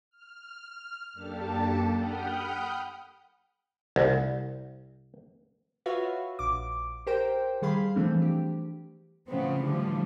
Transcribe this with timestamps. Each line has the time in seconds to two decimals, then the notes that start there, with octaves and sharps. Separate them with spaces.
0.10 F6
1.13 F#2 A#3 D4 G4 A4 A5
1.96 F#5 G5 B5 D#6 F6 G6
3.96 C2
5.86 F4 F#4 B4 C#5 E5 F5
6.39 A#1 D6
7.07 G4 A#4 C5 G5
7.62 D#3 G3 G#4 F5 B5 C6
7.96 E3 F3 A3 C4 D4
8.22 G4
9.28 A2 C#3 F3 B3 C4
9.61 A2 D3 E3 F3 G3